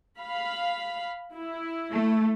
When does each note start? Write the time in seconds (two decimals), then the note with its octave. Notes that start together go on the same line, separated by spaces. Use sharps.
0.19 F5 B5
1.34 E4
1.91 A3